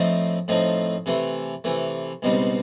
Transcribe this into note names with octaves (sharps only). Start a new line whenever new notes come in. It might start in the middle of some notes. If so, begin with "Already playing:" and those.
Already playing: A2 F3 A3 C4 D#4
A2 F3 A3 C4 D#4
C3 E3 A3
C3 E3 A3
C#2 B2 G3 C4 D#4